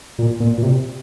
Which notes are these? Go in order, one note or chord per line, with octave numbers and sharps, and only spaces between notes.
A#2
A#2
A#2
C3